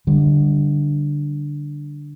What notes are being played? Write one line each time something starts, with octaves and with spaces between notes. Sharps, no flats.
D3 G3